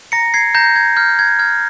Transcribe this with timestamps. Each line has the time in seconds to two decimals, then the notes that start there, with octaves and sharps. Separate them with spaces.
0.12 A#5 A#6 C#7
0.34 G#6 C7
0.55 A#5 G6 A#6
0.76 G#6
0.97 F6 G6
1.19 G#6
1.39 F6 G#6